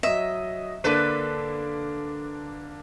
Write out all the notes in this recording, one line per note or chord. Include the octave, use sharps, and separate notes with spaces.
F#3 D#5 E5
D3 A#3 D4 A4 B4